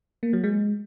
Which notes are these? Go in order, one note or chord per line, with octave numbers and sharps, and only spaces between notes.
A#3
F#3
G#3